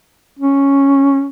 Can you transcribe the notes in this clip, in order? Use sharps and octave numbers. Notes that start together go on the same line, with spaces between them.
C#4